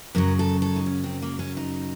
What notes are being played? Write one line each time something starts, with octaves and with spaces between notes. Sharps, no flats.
F#2 C#3 F#3 A#4
A4
A4
D#4
C#4
C4
A#3
C#4
D#4